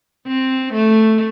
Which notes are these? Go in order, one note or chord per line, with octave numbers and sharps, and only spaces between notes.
C4
A3